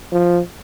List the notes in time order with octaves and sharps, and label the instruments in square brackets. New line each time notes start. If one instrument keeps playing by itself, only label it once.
[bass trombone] F3